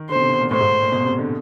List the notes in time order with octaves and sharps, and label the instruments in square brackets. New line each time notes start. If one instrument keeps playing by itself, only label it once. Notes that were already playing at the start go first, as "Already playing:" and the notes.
Already playing: [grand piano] D#3
[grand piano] D3 [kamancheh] C5
[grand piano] B2
C3
B2
A#2
[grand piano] A2 [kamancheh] C5
[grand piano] G#2
A2
A#2
B2
C3
D3